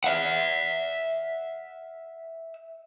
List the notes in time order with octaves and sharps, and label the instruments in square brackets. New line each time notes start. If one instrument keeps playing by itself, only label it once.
[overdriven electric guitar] E5 F#5